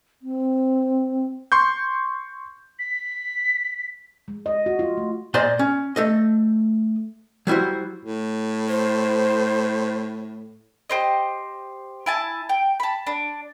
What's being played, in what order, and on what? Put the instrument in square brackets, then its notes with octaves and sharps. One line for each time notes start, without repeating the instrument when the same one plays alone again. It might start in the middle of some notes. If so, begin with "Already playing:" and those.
[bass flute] C4
[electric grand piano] C6 C#6 G6
[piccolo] B6
[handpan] G#3
D#5
F#4
F4
A3
[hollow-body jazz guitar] A#2 C5 D5 D#5 C6
C#4
A3 A4 D#5
F#3 G3 E4 F#4 C5
[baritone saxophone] A2
[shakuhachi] C5
[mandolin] G4 C5 D#5
E4 G#5 A5
G5
A5 B5
D4